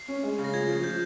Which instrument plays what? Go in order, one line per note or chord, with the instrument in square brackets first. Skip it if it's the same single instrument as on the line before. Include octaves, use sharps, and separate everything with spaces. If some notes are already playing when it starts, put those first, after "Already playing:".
Already playing: [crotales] C7
[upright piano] C#4
G#3
C#3
[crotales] A#6
[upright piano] F3 [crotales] G#6
[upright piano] F3
[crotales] G#6
[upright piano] F3 [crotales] G6